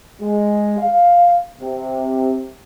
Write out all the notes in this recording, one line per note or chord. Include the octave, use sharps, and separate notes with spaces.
G#3
F5
C3